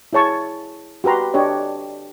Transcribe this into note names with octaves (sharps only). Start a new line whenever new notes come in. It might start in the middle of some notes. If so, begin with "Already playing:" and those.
E4 G#4 C#5 A5 C#6
F#4 G4 B4 A#5 C6
D4 G4 C#5 D#5